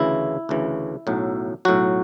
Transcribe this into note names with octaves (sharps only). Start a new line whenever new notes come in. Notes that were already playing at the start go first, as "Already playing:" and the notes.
Already playing: D2 C#3 E3 E4
D2 C#3 E3
B1 A2 F#3
B1 A2 F#3 F#4